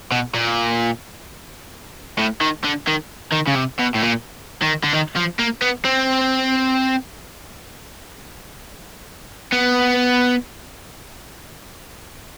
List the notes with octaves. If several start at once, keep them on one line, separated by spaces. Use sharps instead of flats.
B2
A#2
A2
D#3
D3
D#3
D#3
C#3
C3
B2
A2
A#2
D#3
D3
D#3
F3
A#3
B3
C4
B3